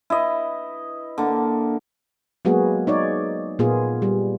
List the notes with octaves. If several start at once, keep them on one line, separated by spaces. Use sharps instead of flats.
E4 B4 D#5
D3 A#3
F#3 G#3 A#3 B3 F#4 G#4
D#4 C#5 D5
A#2 A#3 B3 F4 G#4
G3